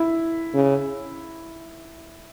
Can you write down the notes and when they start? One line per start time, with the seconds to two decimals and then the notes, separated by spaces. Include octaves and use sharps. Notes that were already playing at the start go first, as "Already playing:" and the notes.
Already playing: E4
0.54 C#3